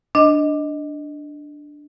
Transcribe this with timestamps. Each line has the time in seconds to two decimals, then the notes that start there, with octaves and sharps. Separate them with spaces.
0.15 D4 D#5